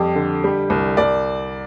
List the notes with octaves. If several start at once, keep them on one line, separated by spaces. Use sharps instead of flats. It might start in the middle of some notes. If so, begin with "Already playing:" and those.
Already playing: F2 G3 G4
D3
G3
C2
C2 D5